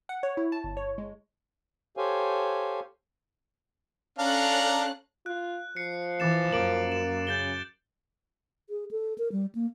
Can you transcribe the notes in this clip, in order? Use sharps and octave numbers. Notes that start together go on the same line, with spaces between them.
F#5
C#5
E4
A5
G1
C#5
G#3
G4 A4 C5 C#5 F5 G#5
C#4 D4 A4 F5 A#5 F#6
F4 F#6
F3 C7 C#7
E3 D6 A6 E7
F#2 A#3 D6 D7 F#7
E7
C#3 G6 A6 G7
G#4
A4
A#4
G3
A#3